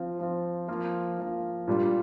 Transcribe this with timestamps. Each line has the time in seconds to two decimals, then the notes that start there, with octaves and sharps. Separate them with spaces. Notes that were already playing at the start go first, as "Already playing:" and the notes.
Already playing: F3 C4 F4
0.19 F3 C4 F4
0.68 F3 A#3 F4
1.18 F3 A#3 F4
1.67 A#2 G3 D4 F4